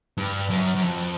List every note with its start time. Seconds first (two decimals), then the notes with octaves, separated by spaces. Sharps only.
0.17 G2
0.50 F#2
0.75 F#2
0.82 F2